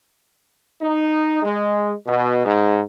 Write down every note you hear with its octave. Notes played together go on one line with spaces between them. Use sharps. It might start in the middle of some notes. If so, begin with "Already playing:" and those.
D#4
G#3
B2
G#2